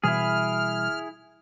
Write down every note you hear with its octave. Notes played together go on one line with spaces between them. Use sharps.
B2 E3 G3 E4 G#4 F6